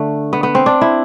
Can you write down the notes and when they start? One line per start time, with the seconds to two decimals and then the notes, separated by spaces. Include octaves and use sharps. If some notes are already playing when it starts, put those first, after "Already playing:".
Already playing: D3 A3
0.33 B3
0.43 B3
0.55 C4
0.66 D4
0.81 E4